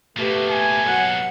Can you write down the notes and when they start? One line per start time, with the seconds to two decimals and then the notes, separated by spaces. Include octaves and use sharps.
0.18 B2 A3 A#3 G4 B4
0.51 G#5
0.86 F#3 F#5